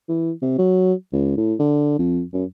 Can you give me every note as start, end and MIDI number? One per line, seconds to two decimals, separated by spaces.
0.09 0.31 52
0.42 0.54 48
0.58 0.93 54
1.13 1.33 37
1.37 1.54 45
1.59 1.97 50
1.99 2.22 41
2.33 2.44 42